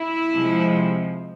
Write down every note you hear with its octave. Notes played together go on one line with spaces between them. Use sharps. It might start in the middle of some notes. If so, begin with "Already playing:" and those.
Already playing: E4
C3 F3 G#3